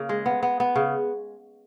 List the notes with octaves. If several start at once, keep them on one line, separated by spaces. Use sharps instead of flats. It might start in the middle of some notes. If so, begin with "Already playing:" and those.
Already playing: C#3 A#3
G#3
B3
B3
B3
C#3